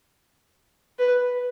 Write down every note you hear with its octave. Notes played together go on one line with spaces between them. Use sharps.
B4